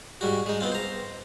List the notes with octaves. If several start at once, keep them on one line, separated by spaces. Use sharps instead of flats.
G#2 G3 F#4
G#3 D#4
B3 C4 F4
C5 A#5